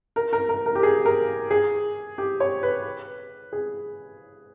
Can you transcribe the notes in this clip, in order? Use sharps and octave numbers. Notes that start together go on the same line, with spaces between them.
A#4
A#4
A#4
A#4
G4
G#4
A#4
G#4
G4
C#5
B4
G#4